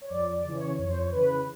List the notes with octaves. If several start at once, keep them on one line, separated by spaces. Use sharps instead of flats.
C#5
F2 D5
D5
C#3 E3
C#5
F2 C#5
C5
C#5
C#3 E3 B4